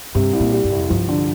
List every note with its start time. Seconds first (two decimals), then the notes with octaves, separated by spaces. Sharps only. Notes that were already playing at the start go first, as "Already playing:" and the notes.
0.15 G2 C3
0.33 C2
0.40 A#2
0.52 G3
0.64 G2
0.71 C2
0.78 F2
0.90 G2 F3
1.09 D3